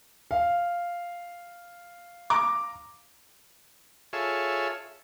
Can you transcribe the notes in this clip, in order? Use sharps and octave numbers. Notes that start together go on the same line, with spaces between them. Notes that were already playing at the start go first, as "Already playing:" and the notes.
F5
A#5 D6
F4 G#4 A4 C#5 E5